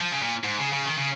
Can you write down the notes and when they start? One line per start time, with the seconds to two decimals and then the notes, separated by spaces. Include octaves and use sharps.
0.01 F3
0.12 C#3
0.22 A#2
0.44 G#2
0.58 C#3
0.73 C#3
0.86 D#3
0.97 C#3